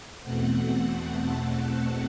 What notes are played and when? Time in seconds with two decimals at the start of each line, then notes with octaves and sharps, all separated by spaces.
0.23 E2 B2 A3 C4 F#5
1.11 A5